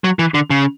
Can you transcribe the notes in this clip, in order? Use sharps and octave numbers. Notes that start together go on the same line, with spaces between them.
F#3
E3
D3
C#3